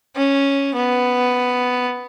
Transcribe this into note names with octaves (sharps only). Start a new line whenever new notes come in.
C#4
B3